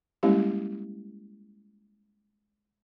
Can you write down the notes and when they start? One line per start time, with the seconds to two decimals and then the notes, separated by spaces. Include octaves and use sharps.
0.23 G3 G#3 A#3 C#4 E4 G4